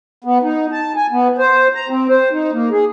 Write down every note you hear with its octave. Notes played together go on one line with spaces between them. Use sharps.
B3
D#4
A5
G#5
B3
C5
A#5
C4
C5
D#4
A#3
G#4